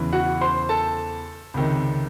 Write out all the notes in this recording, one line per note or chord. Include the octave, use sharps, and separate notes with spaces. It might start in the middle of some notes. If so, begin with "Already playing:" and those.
Already playing: E2 C#3 E3
F#4 F#5
C5 C6
A4 A5
C#2 C3 D#3